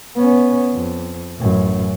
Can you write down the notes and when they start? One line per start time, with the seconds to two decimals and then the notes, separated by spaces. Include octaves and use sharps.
0.16 B3 C#4
0.73 F2
1.39 A1 F#2